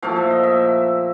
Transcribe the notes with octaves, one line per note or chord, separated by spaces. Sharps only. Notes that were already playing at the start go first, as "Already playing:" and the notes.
A#2 F3 A3 F5
E5
D#5
E5